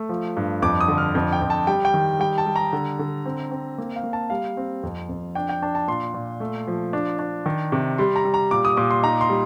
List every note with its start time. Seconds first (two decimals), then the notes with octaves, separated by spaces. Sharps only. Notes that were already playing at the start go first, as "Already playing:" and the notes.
Already playing: A3
0.09 F3
0.37 G2
0.62 F2 D6
0.80 D#6
0.88 D3
0.98 F6
1.15 F2
1.33 G5
1.42 F2
1.50 A5
1.67 G3 G5
1.85 G5
1.94 D#3
2.20 G3 G5
2.38 A5
2.46 G3
2.56 A#5
2.73 D3
2.99 D3
3.26 C4
3.51 C4
3.78 A#3
3.96 F5
4.04 A#3
4.13 A5
4.30 G3 F5
4.57 C4
4.83 F2
5.09 F2
5.35 D4 G5
5.49 G5
5.62 D4 A5
5.75 A5
5.88 A#2 C6
6.14 A#2
6.40 A3
6.68 F3
6.93 D4
7.19 D4
7.46 D#3
7.72 C3
7.98 G3 C6
8.16 A#5
8.25 G3
8.34 A#5
8.51 A#2 D6
8.65 D#6
8.77 A#2 D6
8.91 C6
9.03 D#4 A#5
9.21 C6
9.30 G3